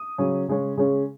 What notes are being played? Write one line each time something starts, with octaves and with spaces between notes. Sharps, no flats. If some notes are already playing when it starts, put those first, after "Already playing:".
Already playing: D#6
C#3 F#3 C#4
C#3 G#3 C#4
C#3 G#3 C#4